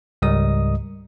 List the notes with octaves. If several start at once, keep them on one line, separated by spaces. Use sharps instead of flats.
C#2 G#2 G3 A#4 D#5 D#6